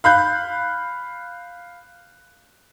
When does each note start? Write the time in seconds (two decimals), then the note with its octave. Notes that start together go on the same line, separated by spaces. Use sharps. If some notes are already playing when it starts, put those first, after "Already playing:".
0.04 F5 B5 F#6 G6